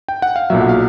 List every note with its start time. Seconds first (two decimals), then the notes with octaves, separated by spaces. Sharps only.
0.08 G5
0.22 F#5
0.36 F5
0.50 B1 A#2 F#3 E5
0.61 F#5
0.69 F5